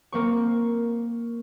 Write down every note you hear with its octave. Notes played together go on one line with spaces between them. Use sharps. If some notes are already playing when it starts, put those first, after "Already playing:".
A#3 C4 C#6